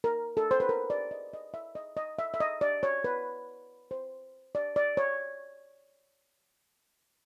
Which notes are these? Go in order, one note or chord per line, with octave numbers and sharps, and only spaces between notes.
A#4
A4
C5
B4
A#4
D5
D#5
D#5
E5
D#5
D#5
E5
E5
D#5
D5
C#5
B4
C5
D5
D5
C#5